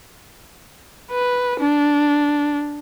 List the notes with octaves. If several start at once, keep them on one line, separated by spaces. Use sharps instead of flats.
B4
D4